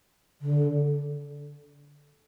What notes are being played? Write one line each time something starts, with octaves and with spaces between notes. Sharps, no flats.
D3